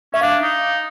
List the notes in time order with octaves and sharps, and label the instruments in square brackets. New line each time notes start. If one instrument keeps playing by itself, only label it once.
[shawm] C#4 [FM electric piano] E5
[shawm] D4 [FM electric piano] F5
[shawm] D#4